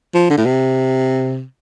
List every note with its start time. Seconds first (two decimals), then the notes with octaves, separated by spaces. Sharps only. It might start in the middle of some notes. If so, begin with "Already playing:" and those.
0.14 F3
0.30 D3
0.38 A2
0.46 C3